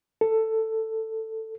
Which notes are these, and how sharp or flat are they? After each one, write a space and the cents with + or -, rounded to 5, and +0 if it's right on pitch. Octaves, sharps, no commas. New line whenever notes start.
A4 +10